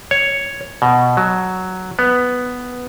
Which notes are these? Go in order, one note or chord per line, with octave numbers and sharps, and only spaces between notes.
C#5
B2
F#3
B3